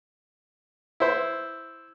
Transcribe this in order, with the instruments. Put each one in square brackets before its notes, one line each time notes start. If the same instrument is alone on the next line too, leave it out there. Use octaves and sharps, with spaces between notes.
[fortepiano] E4 C5